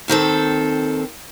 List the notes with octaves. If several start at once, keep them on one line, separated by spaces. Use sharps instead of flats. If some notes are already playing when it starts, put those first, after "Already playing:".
D#2 D#3 C4 A4